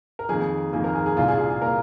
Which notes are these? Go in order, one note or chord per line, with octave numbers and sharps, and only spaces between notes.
A#4
F2 D#3 A#3 G#4
F2 D#3 A#3 G#4
A#4
G#4
G#4
C2 A#2 A#3 F4
G#4
F4
G#4
A#2 A#3 A#4